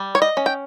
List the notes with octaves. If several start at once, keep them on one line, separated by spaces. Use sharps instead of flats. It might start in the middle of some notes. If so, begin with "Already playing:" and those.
Already playing: G3
C#5
D#5
C#4
G5